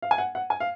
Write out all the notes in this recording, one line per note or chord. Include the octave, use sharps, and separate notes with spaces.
F5
G#5
F#5
F#5
G#5
F5